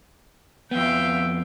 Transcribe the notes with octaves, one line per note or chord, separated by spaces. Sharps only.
F2 B3 E5 F5 G5